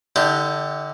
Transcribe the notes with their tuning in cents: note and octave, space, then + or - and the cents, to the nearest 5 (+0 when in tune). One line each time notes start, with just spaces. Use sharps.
D3 +0 D#4 +45 G4 +0